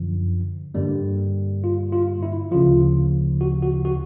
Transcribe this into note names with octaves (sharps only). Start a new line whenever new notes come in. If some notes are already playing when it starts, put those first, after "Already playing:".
Already playing: F#2 D3 F3
G2 D3 G3 A#3
F4
F4
E4
D2 C#3 F3 F4
F#4
F#4
F#4